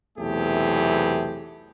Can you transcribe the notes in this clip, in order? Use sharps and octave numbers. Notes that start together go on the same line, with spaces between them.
B1 E2 C3 A3 G4 G#4